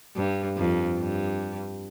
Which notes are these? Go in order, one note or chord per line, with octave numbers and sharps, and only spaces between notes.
G2
F2
G2